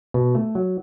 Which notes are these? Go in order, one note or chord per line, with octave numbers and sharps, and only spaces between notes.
B2
A3
F#3